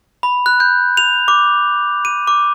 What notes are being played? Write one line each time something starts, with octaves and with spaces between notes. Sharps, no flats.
B5
F#6
G6
F7
D6
D#7
D6